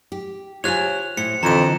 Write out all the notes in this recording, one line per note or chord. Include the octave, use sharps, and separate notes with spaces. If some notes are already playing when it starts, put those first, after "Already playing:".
G4
F4 G4 C5 C#5 G#5 F#6 F7
A2 C5 C#7
F2 D3 E3 A#5 E7